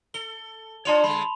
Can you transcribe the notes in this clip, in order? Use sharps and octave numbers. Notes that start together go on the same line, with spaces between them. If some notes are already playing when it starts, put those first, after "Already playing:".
A4 G7
D4 F4 C#5 A5 C6 F7
D3 G3 B5